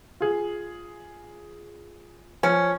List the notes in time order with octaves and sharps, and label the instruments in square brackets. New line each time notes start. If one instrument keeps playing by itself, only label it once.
[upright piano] F4 G#4
[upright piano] F3 [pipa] C#4